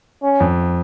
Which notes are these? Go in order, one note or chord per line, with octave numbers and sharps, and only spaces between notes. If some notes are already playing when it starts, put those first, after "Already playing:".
C#4
F2